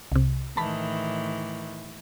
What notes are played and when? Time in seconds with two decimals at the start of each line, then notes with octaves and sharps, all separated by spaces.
0.12 C2 C3
0.57 A2 D#3 E3 A5 B5